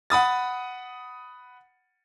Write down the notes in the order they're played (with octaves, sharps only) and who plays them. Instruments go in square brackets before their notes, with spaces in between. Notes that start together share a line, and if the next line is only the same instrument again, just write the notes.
[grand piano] F#5 B5 D#6 A6